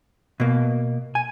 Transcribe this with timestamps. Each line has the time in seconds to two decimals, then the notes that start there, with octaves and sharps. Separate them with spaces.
0.40 B2 A#3
1.15 G#5